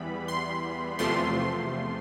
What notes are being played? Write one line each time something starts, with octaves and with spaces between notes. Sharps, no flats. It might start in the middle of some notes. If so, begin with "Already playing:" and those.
Already playing: E2 E3 G3 B3 B5
C6
E2 C3 F3 A3 C6